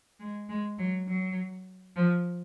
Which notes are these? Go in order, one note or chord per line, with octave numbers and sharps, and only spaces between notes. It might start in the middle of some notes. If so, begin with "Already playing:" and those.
G#3
G#3
F#3
F#3
F3